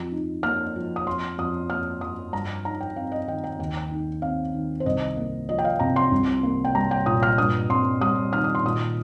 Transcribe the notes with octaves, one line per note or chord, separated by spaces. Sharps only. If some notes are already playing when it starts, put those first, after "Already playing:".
Already playing: F2
D#4
A#3 F6
F3
D#6
F2 C6
F2 D#6
A#3 F6
F3 D#6
G2 A#5
D#4 A#5
G5
C4 F5
D#5
D#3 G5
G5
D#2 G5
D#4
C4 F5
D#3
C5
C2 D#5
A#3
F3 D#5
G5
F5
C3 A#5
C6
C2
A#3
G5
G3 A#5
G5
A#2 D#6
F6
G2 D#6
C4 C6
G3 D#6
D#3 F6
D#6
C6
A#2 D#6